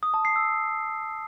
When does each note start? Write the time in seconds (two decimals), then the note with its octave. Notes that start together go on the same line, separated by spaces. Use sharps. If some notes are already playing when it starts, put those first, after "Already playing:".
0.03 D#6
0.14 A5
0.25 C7
0.36 E6